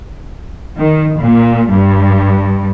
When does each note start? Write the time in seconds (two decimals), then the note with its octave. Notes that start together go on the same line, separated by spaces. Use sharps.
0.77 D#3
1.20 A#2
1.70 G2